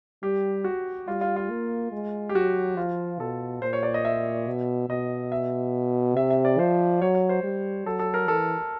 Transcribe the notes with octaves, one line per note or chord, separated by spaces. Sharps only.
G3 G4
F#4
G3 F4
F4
F4
A#3
G#3
G4
F#3 F#4
F3 F4
B2 A4
A#2 C5
C#5
D5
D#5
E5
B2
B2 D#5
E5
C3 E5
E5
D5
F3 C5
F#3 C#5
C#5
C5
G3
F#3 A4
A4
A#4
E3 A4